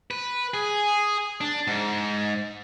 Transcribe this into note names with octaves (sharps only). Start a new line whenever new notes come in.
B4
G#4
D4
G#2